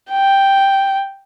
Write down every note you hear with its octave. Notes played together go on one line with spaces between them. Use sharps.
G5